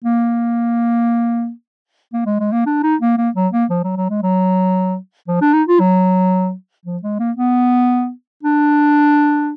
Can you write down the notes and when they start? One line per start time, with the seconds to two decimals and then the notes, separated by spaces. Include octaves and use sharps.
0.04 A#3
2.13 A#3
2.26 G#3
2.40 G#3
2.52 A#3
2.66 D4
2.83 D#4
3.01 A#3
3.18 A#3
3.35 F#3
3.52 A#3
3.70 F3
3.84 F#3
3.97 F#3
4.10 G#3
4.23 F#3
5.28 F3
5.41 D4
5.53 D#4
5.68 F4
5.80 F#3
6.85 F3
7.03 G#3
7.19 A#3
7.37 B3
8.43 D4